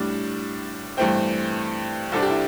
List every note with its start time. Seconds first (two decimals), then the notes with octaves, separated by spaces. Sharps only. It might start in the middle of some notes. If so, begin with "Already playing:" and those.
Already playing: A2 G3 D4
0.97 G2 E3 A3 C4 G5
2.12 C2 C3 G3 D4 A4
2.22 G4
2.30 E4